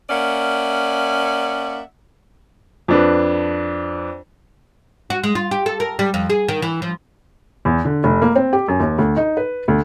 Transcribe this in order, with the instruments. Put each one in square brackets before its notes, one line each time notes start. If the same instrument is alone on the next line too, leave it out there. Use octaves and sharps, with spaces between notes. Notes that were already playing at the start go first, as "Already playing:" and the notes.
[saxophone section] A#3 C#4 D5 E5 F#5
[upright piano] F2 D4 B4
[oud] F#4
G#3
F4
G4
A4
A#4
G3
F2
G#4
D#3
E3
F3
[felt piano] E2
D3
F1
A#3
C4
G4
F#2
D#2
D2
D#4
B4
D2